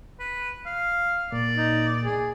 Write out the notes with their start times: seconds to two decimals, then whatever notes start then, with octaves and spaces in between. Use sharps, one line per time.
0.20 B4
0.66 F5
1.32 A#2 D5
1.57 D#4
2.04 G#4